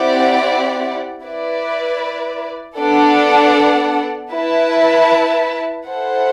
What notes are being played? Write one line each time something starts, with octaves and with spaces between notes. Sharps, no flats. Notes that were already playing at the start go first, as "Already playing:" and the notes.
Already playing: C4 E4 G4 D5 F#5
E4 B4 D5
B3 D4 A4 D5 F#5
E4 B4 E5 A5
E4 A4 C5 F#5